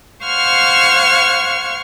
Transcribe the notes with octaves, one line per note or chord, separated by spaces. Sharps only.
C5 F5 F#5 C#6 F6 G#6